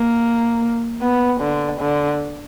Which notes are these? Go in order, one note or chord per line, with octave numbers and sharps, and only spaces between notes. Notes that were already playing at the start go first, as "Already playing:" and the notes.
Already playing: A#3
B3
D3
D3